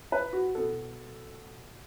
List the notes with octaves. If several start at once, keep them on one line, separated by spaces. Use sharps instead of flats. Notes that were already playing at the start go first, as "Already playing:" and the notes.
B4
F#4
B2 B3 A4